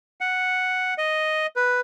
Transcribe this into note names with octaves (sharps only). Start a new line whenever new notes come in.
F#5
D#5
B4